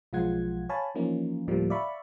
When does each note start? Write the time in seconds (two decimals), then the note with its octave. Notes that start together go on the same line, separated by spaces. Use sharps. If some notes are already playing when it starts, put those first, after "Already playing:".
0.13 B1 F3 G#3 F4 F#5 G#6
0.69 C#5 F5 G#5 A5 B5
0.95 E3 F3 A#3 C#4 D#4 F4
1.48 D2 A2 D3 F3 G3 A#3
1.70 D5 E5 F5 B5 C#6